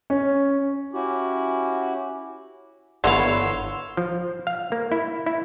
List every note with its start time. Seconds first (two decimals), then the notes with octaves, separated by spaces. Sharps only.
0.10 C#4
0.93 C#4 E4 F#4 G4
3.04 G1 D3 E3 B3 C#5 F5 C6 E6
3.97 F3
4.47 F5
4.72 A#3
4.92 E4
5.26 E4